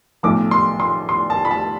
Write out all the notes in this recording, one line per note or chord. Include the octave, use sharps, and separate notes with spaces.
B1 A2 F3 D6
C6
C6
C6
A5
B5
A5